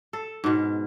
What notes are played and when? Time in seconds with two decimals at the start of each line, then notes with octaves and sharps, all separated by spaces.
0.13 A4
0.44 G#2 B2